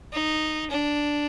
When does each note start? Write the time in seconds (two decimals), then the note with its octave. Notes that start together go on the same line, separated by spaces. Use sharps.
0.13 D#4
0.70 D4